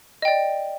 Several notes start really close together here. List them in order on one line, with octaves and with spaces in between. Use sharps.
D#5 G5 D5